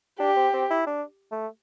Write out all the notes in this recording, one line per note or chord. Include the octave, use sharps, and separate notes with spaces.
D4 G4
C4
C4
E4
D4
A3